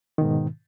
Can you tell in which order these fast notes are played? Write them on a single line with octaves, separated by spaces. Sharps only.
D#3 B2 G#2